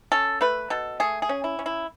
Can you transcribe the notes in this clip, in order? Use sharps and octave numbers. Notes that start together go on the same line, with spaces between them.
C#4 A4
A3 B4
B2 A4
A3 G#4
G#4
C#4
E4
C#4
E4